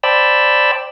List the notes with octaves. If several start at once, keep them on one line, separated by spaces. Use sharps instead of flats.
C5 D5 G5 A5 B5 E6